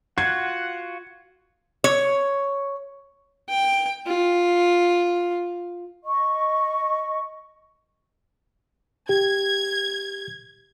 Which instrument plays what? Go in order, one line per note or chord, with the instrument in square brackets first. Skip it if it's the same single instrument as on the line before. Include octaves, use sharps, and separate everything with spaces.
[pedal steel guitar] F4 F#4 [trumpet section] F#5 [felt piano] G#6
[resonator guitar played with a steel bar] C#5
[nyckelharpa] G5
F4
[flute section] D#5 C#6
[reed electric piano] G4 [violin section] G#6